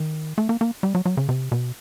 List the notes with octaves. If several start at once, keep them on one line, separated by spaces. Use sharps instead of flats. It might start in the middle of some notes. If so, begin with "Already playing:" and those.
Already playing: D#3
A3
A#3
A#3
G3
F#3
F#3
C#3
C3
B2